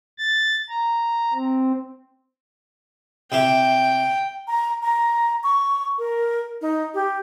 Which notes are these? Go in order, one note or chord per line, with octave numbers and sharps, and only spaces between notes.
A6
A#5
C4
C3 E4 G4 G5
A#5
A#5
C#6
A#4
D#4
G4